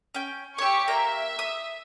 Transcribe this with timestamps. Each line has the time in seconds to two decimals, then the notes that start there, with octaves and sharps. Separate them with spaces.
0.14 C#4 G5
0.58 G4 C#5 C#6 E6
0.88 A#3 E5 A#5
1.39 D#6